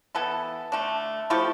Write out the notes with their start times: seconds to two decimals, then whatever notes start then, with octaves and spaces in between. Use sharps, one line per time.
0.15 E3 B3 E4 A4
0.72 D3 A3 D4
1.30 F3 A3 E4 G4